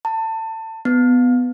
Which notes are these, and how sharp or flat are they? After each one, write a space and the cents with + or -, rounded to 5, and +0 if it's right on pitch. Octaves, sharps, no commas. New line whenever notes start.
A5 +25
B3 +10